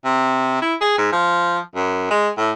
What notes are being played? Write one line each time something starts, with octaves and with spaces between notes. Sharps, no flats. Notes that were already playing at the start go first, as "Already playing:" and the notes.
C3
E4
G#4
G#2
F3
F#2
G#3
A2